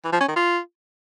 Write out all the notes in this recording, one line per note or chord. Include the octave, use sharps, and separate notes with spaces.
E3
F3
C#4
D#3
F4